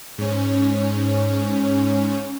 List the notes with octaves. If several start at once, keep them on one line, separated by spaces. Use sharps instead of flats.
G#2 C#4